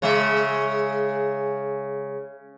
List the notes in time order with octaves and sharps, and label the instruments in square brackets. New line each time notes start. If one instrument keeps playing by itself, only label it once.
[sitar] C#3 G#3 E5